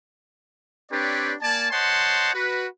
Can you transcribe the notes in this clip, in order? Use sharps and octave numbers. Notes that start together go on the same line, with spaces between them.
C4 D4 G4 B4 C#5 D5
A#3 D5 G#5 A5
C5 C#5 D#5 F#5 A5 C6
F#4 B4